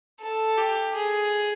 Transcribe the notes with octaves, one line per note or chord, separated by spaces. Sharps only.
A4
G4
G#4